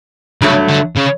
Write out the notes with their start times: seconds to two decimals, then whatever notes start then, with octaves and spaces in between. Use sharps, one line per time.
0.42 G2 C#3 F#3 A3
0.69 D3
0.97 C#3